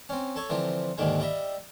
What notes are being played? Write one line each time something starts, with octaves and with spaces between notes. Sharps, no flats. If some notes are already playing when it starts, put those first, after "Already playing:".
C4 C#4
A4 C#5
D3 E3 F3 C4
D#2 G#2 D3 D#3 G#3
G3 D#5 E5